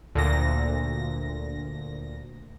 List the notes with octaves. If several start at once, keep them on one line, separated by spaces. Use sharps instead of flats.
D2 A#2 A#6